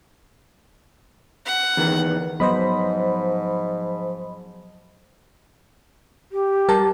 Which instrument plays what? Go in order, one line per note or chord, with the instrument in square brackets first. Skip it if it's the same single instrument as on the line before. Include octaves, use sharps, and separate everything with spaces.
[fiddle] F#5
[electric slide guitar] E2 D#3
[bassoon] G#2 [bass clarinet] F3 [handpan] F#3 B3 [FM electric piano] C5 D#5 B5
[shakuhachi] G4
[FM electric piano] G3 A#4 A5